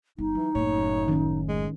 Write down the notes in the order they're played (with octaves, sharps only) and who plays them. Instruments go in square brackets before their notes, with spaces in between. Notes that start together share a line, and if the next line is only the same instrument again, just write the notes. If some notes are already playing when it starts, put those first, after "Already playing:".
[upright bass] G1 [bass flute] D#4
[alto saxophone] E3 [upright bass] F#3
[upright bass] F#1 A2 [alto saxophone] C#5
[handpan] D#3 C#4
[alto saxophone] G#3